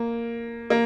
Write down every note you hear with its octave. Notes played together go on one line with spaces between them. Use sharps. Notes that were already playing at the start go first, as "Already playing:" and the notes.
Already playing: A#3
A#3